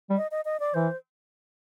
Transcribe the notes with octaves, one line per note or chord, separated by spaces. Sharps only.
G3
D#5
D#5
D#5
D5
E3 C5